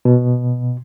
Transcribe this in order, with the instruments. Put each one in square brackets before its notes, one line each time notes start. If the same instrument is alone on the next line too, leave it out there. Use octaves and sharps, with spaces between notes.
[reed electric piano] B2